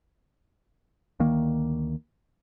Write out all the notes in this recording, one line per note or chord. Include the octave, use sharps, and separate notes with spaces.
D2 D#3 A#3